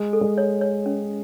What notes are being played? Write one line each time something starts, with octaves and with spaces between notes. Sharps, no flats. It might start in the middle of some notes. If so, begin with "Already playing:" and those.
Already playing: G#3
A4
G#3
C#5
C#5
C#4